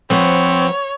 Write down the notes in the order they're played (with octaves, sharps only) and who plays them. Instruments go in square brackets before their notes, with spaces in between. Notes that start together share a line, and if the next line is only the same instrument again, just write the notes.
[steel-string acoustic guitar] F3 B4 F#5 [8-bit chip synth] C4 [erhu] C#5